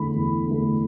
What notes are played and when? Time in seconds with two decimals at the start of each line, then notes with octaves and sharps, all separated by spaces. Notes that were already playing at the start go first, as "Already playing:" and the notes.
Already playing: E2 D3 A3 B5
0.14 E2
0.46 D3 A3